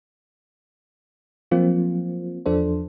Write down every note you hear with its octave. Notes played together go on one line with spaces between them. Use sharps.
F3 F#3 A#3 C4 F4
E2 F3 D4 A4 C5